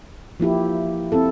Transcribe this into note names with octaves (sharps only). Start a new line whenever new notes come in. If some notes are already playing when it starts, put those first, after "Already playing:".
F3 A#3 E4 G4
C4 E4 A4